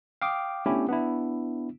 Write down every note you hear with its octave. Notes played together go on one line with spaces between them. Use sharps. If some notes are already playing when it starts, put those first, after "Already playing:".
F5 G5 D6 D#6
A3 B3 C#4 D4 E4 G4
B3 D4 E4